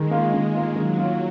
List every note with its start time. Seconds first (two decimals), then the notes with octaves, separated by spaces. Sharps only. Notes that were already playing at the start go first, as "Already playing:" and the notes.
Already playing: D#3 G#3
0.11 A#3 F4
0.33 D#3
0.54 A#3 F4
0.76 D#3 F#3
0.98 A#3 F4